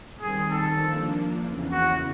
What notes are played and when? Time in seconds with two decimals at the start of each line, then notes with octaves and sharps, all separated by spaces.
0.21 D#3 G3 C4 G#4
0.50 A4
0.81 F3 A#3 D4
1.41 E2 C#3 E3
1.71 F#4